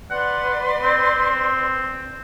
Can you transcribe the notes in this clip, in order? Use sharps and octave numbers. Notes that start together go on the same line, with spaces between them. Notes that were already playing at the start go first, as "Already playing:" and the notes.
B4 D5 F#5 C6
C4